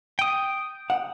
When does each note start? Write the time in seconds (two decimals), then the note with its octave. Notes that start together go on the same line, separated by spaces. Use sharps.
0.19 G5 D#6
0.90 F#5